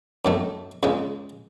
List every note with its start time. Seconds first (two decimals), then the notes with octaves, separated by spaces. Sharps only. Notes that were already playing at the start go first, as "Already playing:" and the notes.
0.25 F#2 D#3 F#3 A3
0.83 C#2 C#3 G#3